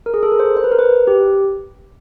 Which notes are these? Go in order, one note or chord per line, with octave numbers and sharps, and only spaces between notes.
A#4
G#4
A4
A#4
C5
C5
B4
A#4
B4
G4